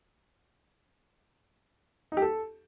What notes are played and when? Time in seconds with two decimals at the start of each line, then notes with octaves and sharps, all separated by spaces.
2.12 D#4
2.17 G4
2.22 A4